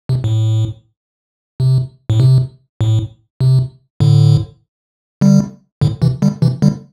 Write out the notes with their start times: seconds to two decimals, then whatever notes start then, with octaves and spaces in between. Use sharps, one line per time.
0.09 C3
0.24 A2
1.60 C3
2.10 A2
2.20 C3
2.81 A2
3.41 C3
4.00 A2 D3
5.21 D3 G3
5.81 A2 D3
6.02 C3 E3
6.22 D3 G3
6.42 C3 E3
6.62 D3 G3